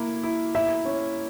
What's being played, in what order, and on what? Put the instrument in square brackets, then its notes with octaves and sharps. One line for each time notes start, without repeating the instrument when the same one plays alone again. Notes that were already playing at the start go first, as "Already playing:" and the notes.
Already playing: [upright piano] A#3 E4
E4
[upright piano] E4 [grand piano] E5
[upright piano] C#4